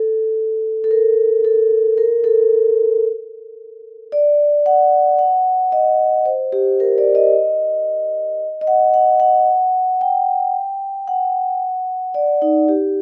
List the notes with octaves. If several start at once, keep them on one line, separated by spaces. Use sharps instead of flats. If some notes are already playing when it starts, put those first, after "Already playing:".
Already playing: A4
A4
A#4
A4
A#4
A4
D5
F#5
F#5
D#5
C5
G4
A#4
D5
D#5
D#5
F#5
F#5
F#5
G5
F#5
D5
D#4
G4